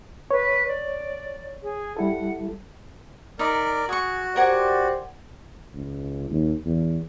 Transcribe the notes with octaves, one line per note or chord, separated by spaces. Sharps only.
B4 C#5
D5
G#4
G3 E4 A4 F#5
D#4 A#4 D5 B5
F#4 G#4 C#6
G4 A#4 C5 D5 F#5 G#5
C#2
D#2
E2